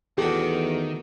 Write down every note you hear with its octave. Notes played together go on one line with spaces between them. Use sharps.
E2 D#3 A3 F#4 G4